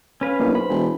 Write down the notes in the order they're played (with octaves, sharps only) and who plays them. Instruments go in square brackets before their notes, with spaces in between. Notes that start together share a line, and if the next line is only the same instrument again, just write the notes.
[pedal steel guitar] C#4 B4 F5
[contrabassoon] B1 [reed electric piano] A#3 D4 E4
[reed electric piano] B4 C5 [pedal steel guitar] B5
[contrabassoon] E1